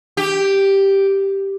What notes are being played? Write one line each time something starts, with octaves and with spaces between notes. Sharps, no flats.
G4